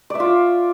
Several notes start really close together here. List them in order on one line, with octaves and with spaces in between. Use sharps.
D5 E5 F4